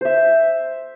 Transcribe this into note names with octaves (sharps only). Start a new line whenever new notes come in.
C5 E5